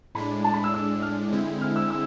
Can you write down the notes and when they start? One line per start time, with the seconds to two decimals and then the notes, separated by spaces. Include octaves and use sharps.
0.15 A2 G#3 D4 B5
0.44 A5
0.53 B5
0.64 E6
0.74 E6
1.02 F6
1.32 D3 G#3 C4 E4
1.61 F6
1.76 E6
1.90 E6